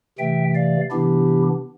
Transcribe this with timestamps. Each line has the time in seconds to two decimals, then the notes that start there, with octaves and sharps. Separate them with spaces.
0.19 C3 E3 A3 E5 G5
0.55 D5 F5
0.91 C3 E3 B3 D4 E4 G4